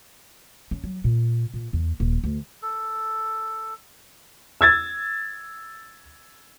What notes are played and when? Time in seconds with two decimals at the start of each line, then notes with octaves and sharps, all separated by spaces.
0.71 C#4
0.84 F#3
1.04 A#2
1.54 A#2
1.73 E2
2.00 D#1
2.24 D2
2.62 A4
4.61 E6 G#6 A6